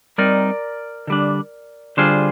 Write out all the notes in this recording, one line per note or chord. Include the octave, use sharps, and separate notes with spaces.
G3 C4 D#4 A#4 D5
D3 G3 D4
D3 G3 D4 F4 G#4 C5